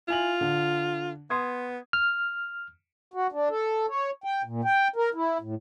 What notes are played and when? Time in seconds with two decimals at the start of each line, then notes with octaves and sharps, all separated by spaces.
0.08 E4 F4 G#5 F#7
0.41 D3
1.30 B3 C6 D#6 G#6
1.93 F6
3.14 F#4
3.32 D4
3.50 A4
3.89 C#5
4.24 G5
4.44 A#2
4.64 G5
4.96 A#4
5.15 E4
5.41 A2